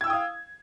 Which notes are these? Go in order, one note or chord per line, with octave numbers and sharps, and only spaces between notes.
F5 G5 D#6 E6 G#6